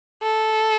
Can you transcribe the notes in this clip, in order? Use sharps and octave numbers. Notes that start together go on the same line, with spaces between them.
A4